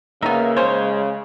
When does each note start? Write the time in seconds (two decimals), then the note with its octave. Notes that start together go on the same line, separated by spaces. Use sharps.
0.22 C#3 A#3 B3 D#4 E5
0.57 G#3 C#4 C5 C#5